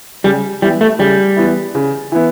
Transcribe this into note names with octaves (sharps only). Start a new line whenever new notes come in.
C#3 G3
E3 G3 B3 E4
A3
C#3 G3
E3 B3 E4
C#3
E3 B3 E4